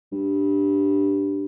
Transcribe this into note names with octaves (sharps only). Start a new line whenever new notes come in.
G2